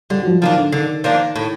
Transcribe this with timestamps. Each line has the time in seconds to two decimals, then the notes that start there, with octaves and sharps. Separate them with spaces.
0.10 D3 G3
0.22 F#3
0.26 F3
0.41 D#3 F3 A#3 D4
0.57 D3
0.72 D3 D#3
1.04 F3 A#3 D4
1.36 A2